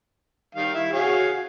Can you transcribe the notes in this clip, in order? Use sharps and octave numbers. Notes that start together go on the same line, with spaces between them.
D#3 G3 F5
E4 E5
F#4 G#4 C#5 F5